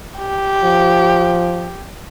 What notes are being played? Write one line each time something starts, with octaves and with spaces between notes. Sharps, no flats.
G4
F3